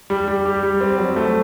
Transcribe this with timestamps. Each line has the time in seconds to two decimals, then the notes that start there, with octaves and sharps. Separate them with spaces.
0.10 G3
0.28 G3
0.45 G4
0.63 G3
0.81 C4
0.98 F#3
1.16 A3